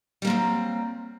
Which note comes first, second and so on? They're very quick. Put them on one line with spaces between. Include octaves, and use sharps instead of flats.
G3 A#3 C4 F#3